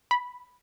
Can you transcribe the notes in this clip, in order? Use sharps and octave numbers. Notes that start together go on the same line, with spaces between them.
B5